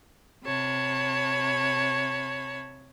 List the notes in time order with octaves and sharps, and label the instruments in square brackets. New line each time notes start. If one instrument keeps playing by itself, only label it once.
[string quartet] C3 C#5 A5 B5